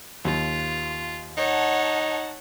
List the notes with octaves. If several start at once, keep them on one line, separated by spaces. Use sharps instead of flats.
D#2 F4
D#4 C#5 F#5 A5